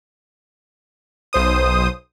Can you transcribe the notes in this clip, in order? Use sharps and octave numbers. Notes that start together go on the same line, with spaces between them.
B1 C5 D#6